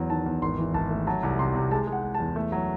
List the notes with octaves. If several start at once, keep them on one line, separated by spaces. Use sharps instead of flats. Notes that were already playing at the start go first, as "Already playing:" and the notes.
Already playing: E2 F#3
D#3 A5
E2
G#1 C6
E3
G#1 A5
A3
F#3 A5
C2
C3 C6
C3
G#3 A5
G#3
F#5
G#3
A5
E2
A3
F#3